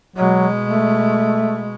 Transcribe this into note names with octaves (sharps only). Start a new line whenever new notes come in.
B2 F#3 G#3
A3